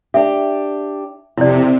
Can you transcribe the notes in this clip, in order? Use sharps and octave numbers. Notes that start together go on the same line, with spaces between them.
D4 G4 E5
F2 C3 E4 D5